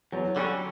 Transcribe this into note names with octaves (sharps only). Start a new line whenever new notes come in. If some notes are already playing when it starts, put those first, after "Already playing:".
E2 F#3
D3 G3 C#4 F#4